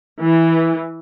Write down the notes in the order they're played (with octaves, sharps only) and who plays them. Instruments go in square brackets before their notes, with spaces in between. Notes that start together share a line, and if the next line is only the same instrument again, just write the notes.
[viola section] E3